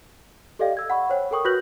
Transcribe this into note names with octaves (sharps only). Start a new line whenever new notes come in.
G4 A4 D5 D#5 F5 G5
E6 G#6
F#5 B5 C#6
C5 C#5 G5
A4 A#4 G5 C#6 D#6
F#4 B4 F#6 G6 A#6 F#7